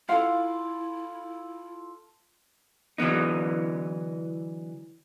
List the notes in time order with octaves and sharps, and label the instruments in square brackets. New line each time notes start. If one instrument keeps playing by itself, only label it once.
[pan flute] E4 [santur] F4 A4 [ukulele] F5 F#5
[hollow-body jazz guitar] D3 E3 F#3 B3 D#4